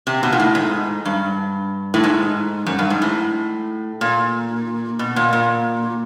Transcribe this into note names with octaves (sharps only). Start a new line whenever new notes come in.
C3
B2
A#2
A2
G#2
G2
A2
G#2
F#2
G2
G#2
A2
A#2
B2
A#2
A#2